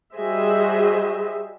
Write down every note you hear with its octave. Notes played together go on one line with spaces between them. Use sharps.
G3 F#4 G#4 C5 D#5 E5